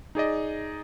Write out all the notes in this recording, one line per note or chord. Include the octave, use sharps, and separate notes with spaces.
D#4 G#4 D5 D#5